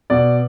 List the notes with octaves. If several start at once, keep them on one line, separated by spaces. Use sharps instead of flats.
B2 D5